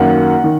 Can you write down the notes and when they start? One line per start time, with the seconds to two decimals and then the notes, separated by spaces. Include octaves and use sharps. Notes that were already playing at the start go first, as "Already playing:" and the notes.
Already playing: F#2 D#3 A#3 F#5
0.44 D#3